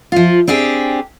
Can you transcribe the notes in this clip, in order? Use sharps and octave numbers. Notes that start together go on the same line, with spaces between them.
F3 F4
C4 D4 G4 G#4